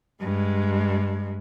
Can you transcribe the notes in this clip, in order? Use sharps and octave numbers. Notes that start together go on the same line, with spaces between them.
G2 G#3